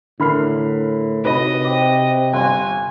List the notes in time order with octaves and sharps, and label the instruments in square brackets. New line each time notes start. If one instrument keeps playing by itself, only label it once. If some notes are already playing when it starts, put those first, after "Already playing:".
[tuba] A2 [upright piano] D3 B5 F6 [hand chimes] E4 A#4 C7
[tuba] C3 [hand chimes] D#4 F#4 C#5 [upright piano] B4 B5 [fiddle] D#5
[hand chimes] C5 G5 D6
[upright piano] G1 [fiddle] G#5 [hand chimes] C6 F#6